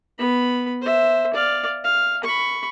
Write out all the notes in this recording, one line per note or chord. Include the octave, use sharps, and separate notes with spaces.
B3 B5
C5 E5
D5 F5
F5
B5 C#6